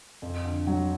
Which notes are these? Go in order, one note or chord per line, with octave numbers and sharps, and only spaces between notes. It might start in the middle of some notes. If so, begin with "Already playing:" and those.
F2
D3
F#3